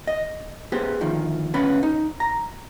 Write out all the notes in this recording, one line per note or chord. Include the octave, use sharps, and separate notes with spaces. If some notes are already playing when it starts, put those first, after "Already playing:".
D#5
B3 G4 G#4 C5
D2 D#3 F3
D2 B3 C#4 B5
D#4
A#5